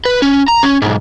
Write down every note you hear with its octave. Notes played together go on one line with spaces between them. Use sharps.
B4
C#4
A#5
C#4
B1 G#2